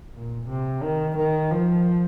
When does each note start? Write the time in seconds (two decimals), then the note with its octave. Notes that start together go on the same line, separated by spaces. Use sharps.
0.14 A#2
0.49 C3
0.83 D#3
1.17 D#3
1.51 F3